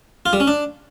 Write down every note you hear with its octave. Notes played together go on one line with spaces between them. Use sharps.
F4
G3
C#4
D4